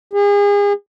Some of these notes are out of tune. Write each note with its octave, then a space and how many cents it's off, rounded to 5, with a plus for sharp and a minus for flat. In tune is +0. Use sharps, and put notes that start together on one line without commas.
G#4 -35